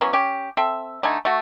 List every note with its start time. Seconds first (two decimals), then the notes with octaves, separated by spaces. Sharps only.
0.01 E3 F#3 B3 C#4
0.13 C#4 G4
0.57 C4 A4 E5
1.03 D3 A3 D#4 G#5
1.25 A3 F#4